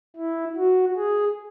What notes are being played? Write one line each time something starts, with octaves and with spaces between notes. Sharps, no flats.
E4
F#4
G#4